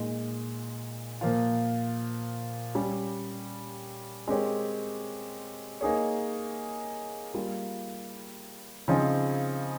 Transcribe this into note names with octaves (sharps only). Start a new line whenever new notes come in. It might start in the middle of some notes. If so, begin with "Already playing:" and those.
Already playing: A#2 G#3 D#4
A#2 F3 A#3 F4
G3 C#4 G4
G#3 C4 G4 A#4 C#5
A#3 D#4 G#4 C#5
G3 A#3 F4
C#3 F3 C4 D#4 G#4